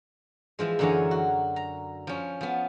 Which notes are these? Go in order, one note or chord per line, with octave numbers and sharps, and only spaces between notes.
E3 F3 G#3
F#2 D3 E3 C#5 G#5 A#5
F#4
A#5
F3 C#4
F3 B3